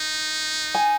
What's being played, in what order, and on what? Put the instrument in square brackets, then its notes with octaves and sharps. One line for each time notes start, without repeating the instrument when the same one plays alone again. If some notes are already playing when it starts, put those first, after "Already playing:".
Already playing: [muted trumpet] D#4
[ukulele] G#5